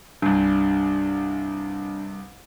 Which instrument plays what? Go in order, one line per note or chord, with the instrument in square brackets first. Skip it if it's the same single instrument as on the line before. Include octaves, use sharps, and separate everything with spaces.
[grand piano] C2 G2 [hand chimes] D4